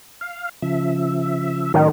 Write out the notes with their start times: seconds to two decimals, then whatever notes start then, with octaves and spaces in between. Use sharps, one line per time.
0.21 F5
0.62 C#3 F3 E5
1.74 A2 D#3 F#3 C#4